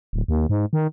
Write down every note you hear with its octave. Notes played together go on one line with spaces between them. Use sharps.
D1
D#2
G#2
D#3